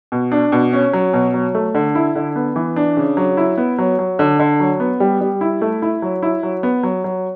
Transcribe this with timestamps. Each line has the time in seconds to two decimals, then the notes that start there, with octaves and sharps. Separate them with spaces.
0.12 B2
0.32 D4
0.52 B2
0.73 C#4
0.93 F#3
1.13 B2
1.34 F#3
1.54 A3
1.75 D3
1.95 E4
2.15 D3
2.36 B3
2.56 E3
2.76 D4
2.97 C#3
3.17 F#3
3.37 E4
3.58 B3
3.78 F#3
3.99 F#3
4.19 D3
4.40 D3
4.60 F#3
4.80 B3
5.00 G3
5.21 G3
5.41 E4
5.61 A3
5.82 E4
6.02 F#3
6.23 E4
6.43 F#3
6.63 B3
6.83 F#3
7.04 F#3